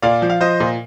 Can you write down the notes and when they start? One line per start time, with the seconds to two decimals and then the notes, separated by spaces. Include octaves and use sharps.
0.02 A#2 D5 F5
0.22 F3
0.30 F5
0.40 F3 C5 D#5
0.60 A#2